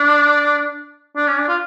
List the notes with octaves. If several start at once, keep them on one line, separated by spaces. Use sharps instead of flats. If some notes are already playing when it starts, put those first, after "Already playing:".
Already playing: D4
D4
C#4
D4
F4